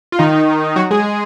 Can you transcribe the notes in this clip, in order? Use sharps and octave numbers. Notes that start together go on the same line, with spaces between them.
F4
D#3 D#4
F#3 F#4
G#3 G#4